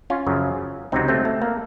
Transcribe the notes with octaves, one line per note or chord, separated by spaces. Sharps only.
C#4 F4
F#2 C#3 F3
C#2 C3 F#3 C4 D#4
A3 C4
A3
A#3